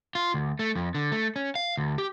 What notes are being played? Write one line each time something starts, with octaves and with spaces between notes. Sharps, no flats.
F4
D2
A3
F2
D3
A3
C#4
F5
D2
G4